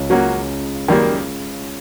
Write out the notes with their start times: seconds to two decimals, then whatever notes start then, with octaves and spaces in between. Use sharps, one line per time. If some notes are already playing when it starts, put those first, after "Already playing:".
Already playing: C#2 C#3
0.10 F#3 A#3 C#4 F#4
0.88 F#2 D#3 G3 A#3